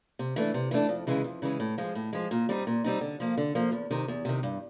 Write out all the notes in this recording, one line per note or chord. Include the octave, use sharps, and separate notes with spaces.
C3
E3 A3 D4
C3
E3 A3 D4
F2
C#3 E3 G#3
F2
C#3 E3 G#3
A2
F3 G#3
A2
F3 G#3
A#2
G3 C4 D#4
A#2
G3 C4 D#4
D3
F3 A#3
D3
F3 A#3
E2
C3 D#3
E2
C3 D#3
G2